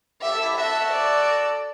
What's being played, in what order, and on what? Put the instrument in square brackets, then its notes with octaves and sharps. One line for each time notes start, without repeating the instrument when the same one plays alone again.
[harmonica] G4 [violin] E5
[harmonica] A4
E4 G4
[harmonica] F#4 A4 [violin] E5
[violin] D5